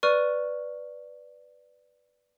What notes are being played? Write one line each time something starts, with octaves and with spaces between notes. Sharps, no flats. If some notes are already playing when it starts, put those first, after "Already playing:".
B4 D5 C#6 F6 D#7